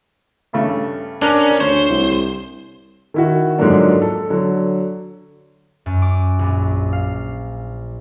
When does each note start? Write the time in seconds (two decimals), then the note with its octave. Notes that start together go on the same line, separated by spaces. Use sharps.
0.53 G2 C#3 A3
1.22 C#4 D4 A#4
1.60 D2 C5 C#5
1.89 C2
3.14 D#3 E4 F#4
3.58 G#2 D3 F3 F#3 A#3 D4
4.02 A4
4.30 D3 F#3
5.86 F#2
6.02 D6
6.39 A#1
6.93 F5